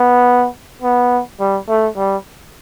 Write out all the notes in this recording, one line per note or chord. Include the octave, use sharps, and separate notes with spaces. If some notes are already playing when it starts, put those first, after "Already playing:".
Already playing: B3
B3
G3
A3
G3